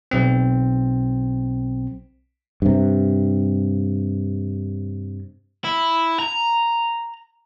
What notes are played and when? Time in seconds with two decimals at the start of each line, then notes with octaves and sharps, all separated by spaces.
0.11 B1 C4
2.62 G2 C3
5.65 E4
6.20 A#5